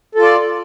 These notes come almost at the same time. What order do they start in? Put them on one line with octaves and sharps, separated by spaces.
A4 F4 D5